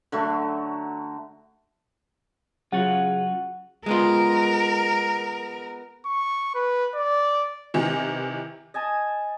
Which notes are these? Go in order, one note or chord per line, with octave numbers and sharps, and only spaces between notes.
D3 F#3 A3
C#3 F#3 F4 F#4 F#5
G#3 B3 F4 A#4
C#6
B4
D5
C3 D#3 E3
D#5 G#5 A5 D#6